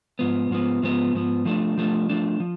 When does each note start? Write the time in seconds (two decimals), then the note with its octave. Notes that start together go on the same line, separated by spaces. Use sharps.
0.19 G#2 F3 B3
0.50 G#2 F3 B3
0.83 G#2 F3 B3
1.14 G#2 F3 B3
1.46 F3 A3 D4
1.78 F3 A3 D4
2.10 F3 A3 D4
2.40 F3